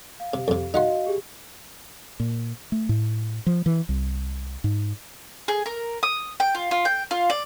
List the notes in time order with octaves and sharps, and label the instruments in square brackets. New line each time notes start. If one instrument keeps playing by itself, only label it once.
[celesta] F5
[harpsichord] C3
F2 C3
[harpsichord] D#4 F#5 C6 [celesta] F#4 D#5 F5
[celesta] G4 G#4
[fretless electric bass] A#2
A3
A2
F3
E3
C2
G#2
[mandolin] G#4
A#4
D#6
G5
F4
F4
G5
F4
D5